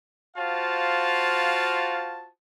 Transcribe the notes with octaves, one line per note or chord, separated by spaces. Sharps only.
F4 F#4 C5 F5 A5